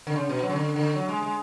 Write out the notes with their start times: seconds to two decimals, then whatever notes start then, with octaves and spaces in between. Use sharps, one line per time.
0.07 D3
0.16 C#3
0.29 B2
0.43 F#3
0.50 C#3
0.56 D3
0.76 D3
0.96 F#3
1.09 G#3
1.22 G#3